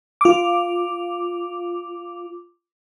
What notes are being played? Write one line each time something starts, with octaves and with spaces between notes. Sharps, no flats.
F4 D6